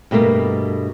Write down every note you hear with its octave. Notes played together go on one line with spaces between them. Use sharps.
G2 B2 A3 A#3